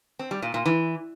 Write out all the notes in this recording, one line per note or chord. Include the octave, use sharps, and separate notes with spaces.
C4
G3
A#2
A#2
E3